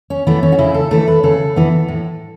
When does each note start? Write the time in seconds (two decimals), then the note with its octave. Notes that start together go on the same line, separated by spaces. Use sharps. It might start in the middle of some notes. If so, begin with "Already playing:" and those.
0.10 C#4
0.27 E3 A3 B3
0.43 C#4
0.52 F#4
0.59 C#3 E4
0.74 A4
0.91 E3 A3 A4
1.08 B4
1.23 C#3 A4
1.56 E3 B3
1.88 A2